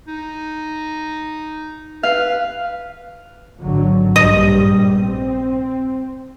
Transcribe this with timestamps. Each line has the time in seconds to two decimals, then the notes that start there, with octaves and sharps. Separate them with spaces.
0.07 D#4
2.03 B4 F5
3.60 G#1 D3 F#3
4.16 A#1 G2 G3 D#5
5.00 C4